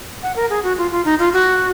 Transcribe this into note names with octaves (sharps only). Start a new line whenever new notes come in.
F#5
A#4
G#4
F#4
F4
F4
D#4
F4
F#4